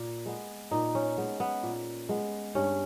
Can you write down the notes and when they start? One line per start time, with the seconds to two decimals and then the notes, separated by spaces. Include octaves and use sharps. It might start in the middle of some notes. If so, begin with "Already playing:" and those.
Already playing: A#2
0.26 G#3 B3
0.71 A#2 D#4
0.95 C#4
1.18 G#3 B3
1.40 B3
1.63 A#2
2.09 G#3 B3
2.55 G2 C#4